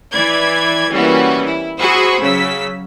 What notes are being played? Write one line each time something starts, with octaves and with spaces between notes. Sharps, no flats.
E3 D5 B5 G#6
E3 G3 A#3 B3 C#4 F#4
E4
F#4 G#4 C5 B5 C#6 E6
C#3 F#3 E6 B6